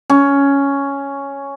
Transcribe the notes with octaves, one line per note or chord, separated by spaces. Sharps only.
C#4